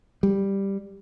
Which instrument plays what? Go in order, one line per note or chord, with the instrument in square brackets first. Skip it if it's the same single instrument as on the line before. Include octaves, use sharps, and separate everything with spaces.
[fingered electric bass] G3